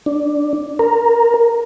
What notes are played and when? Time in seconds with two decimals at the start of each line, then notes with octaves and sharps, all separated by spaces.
0.06 D4
0.79 A#4